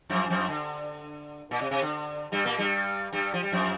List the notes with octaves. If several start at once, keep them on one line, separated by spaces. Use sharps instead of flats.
F2 F3
F2 F3
D3
A#2
C3
C3
D3
G2 G3
A#2 A#3
G2 G3
G2 G3
F3
G3
F2 F3